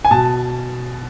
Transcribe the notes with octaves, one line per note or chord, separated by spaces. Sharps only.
G#5
B2 A5